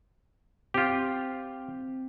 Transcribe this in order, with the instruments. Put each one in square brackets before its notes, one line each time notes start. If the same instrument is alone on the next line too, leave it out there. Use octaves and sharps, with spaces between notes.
[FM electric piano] C4 G5 [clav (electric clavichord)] F4 G4